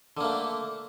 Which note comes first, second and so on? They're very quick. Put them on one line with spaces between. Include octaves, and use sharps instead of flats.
D3 A#3 A3